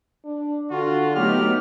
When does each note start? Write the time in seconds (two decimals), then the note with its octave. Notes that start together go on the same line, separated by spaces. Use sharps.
0.25 D4
0.71 D3 F4 F#4
1.15 F#3 A3 B3 D#4 G4 F6